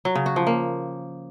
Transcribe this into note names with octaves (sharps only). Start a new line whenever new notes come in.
F#3
C#3
F#4
F3
A#3